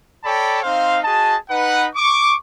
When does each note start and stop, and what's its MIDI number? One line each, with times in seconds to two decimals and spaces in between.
0.24 0.62 69
0.24 0.62 73
0.24 0.62 74
0.24 0.62 79
0.24 0.62 81
0.24 0.62 83
0.63 0.99 60
0.63 0.99 63
0.63 0.99 72
0.63 0.99 77
1.04 1.36 66
1.04 1.36 68
1.04 1.36 75
1.04 1.36 81
1.50 1.88 63
1.50 1.88 71
1.50 1.88 78
1.96 2.36 85
1.96 2.36 86